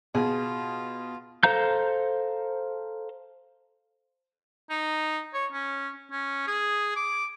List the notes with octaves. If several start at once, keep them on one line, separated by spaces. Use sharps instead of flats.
B2 F4 G#4
A4 C5 F5 A#5 G6
D#4
C#5
C#4
C#4
G#4
D6